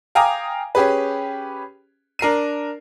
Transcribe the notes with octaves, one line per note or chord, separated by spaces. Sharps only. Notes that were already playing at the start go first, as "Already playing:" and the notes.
F5 G5 G#5 A#5 D6 D#6
C#4 G4 G#4 B4
D4 A#4 C7 D#7